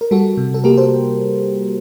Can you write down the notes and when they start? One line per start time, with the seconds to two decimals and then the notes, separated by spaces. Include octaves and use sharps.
0.01 A#4
0.11 G3 F#4 A4
0.37 C3
0.54 A4
0.64 A#3 G4 A#4
0.77 A4 C5